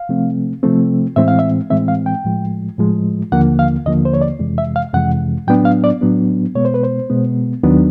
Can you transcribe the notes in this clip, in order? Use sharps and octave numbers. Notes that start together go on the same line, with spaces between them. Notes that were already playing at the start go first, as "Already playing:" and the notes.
Already playing: F5
C3 F3 A3 C4
C3 F3 A3 C4
A2 E3 G#3 C4 E5
F5
E5
A2 E3 G#3 C4 E5
F5
G5
A2 F3 G#3
A2 F3 G#3
D#2 D3 F3 A#3 F#5
F5
D#2 D3 F3 A#3 D#5
C5
C#5
D5
F2 C3 E3 G#3
E5
F5
F2 C3 E3 G#3 F#5
A2 F#3 B3 D4 G5
F5
D5
A2 F#3 B3 D4
B2 G#3 B3 C#5
C5
B4
C5
B2 G#3 B3
D#2 D#3 F#3 B3 D4